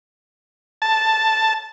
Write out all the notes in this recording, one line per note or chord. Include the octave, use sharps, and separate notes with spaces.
A5